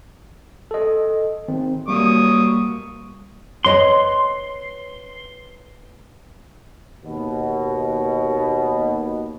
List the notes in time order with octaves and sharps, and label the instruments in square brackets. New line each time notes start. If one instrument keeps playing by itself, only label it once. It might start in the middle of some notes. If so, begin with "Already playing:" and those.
[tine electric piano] A4 D#5
D#3 C4
[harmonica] F#3 C#6 D#6 [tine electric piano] G3 A#3
[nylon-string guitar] B4 C#5 D#5 [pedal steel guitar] C6
[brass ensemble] D#2 B2